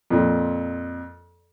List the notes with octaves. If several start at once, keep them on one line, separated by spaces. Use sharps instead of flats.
F2 A#2